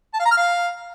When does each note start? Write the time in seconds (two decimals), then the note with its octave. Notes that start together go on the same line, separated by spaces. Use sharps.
0.14 A5
0.19 F5
0.25 A#5
0.31 F6
0.37 F5